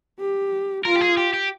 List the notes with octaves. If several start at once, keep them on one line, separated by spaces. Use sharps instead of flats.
G4
F4 A#4
G4
G#4
G4
G4